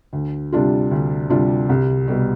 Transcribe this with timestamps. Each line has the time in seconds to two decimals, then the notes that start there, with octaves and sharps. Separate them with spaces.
0.13 D2
0.52 C3 G3 D4 F4
0.91 D2
1.30 C3 G3 D4 F4
1.69 C2
2.08 B2 G3